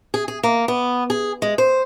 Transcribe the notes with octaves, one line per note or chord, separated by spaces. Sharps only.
G#4
G#4
A#3
B3
G#4
G#3
C5